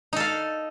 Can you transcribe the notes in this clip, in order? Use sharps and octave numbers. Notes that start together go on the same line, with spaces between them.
D#4 A4 F5